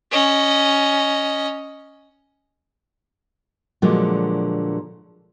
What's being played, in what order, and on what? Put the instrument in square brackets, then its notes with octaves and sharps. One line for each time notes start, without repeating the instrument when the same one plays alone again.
[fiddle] C#4 D#5
[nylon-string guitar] A#2 D3 F3 F#3 G#3